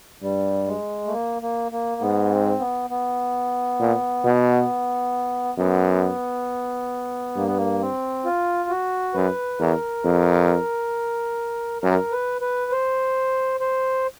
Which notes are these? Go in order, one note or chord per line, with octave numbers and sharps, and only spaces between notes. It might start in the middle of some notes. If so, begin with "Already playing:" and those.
G2 G3
G#3
A3
A#3
A#3
A#3
G#2 B3
C4
B3
B3
A#2
B2
F#2 B3
G2 A#3
B3
A#3
C4
F4
F#4
F#2 B4
E2 A#4
F2
F#2 A#4
B4
B4
C5
C5